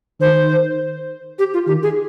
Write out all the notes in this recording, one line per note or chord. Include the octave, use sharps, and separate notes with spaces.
D#3 C5
G4
F4
D#3 G4
G#4